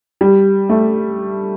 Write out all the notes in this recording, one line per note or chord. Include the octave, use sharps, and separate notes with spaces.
G3
A3